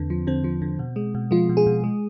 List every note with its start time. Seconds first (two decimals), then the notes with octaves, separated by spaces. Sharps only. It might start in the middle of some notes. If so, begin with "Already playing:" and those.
Already playing: E2 D3 C4
0.10 F3
0.27 D3 C4
0.44 F3
0.62 D3
0.79 B2
0.96 G#3
1.15 B2
1.31 F3 G#3 F4
1.49 B2
1.57 G#3 G#4
1.66 B2
1.84 G#3